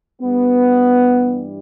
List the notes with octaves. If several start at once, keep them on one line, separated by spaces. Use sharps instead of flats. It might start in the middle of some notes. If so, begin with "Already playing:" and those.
G2 E3 G3 B3